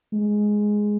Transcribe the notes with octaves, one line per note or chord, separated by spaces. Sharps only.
G#3